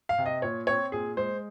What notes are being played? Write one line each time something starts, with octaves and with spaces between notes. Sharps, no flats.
F5
C3
D#5
A#2 C#5
C4 C#5
A#2 G#4
G#3 C5